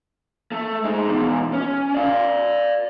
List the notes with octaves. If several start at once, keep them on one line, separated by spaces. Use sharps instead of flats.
A3
G#3 D#4
E2 B2
C#4
D5 F5